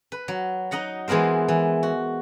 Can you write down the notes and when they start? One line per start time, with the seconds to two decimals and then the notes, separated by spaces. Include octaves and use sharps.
0.12 B4
0.28 F#3
0.71 D#4 D#5 F#5 A#5
1.08 E3 G#3 B3 A#4 C5
1.48 E3
1.83 F#4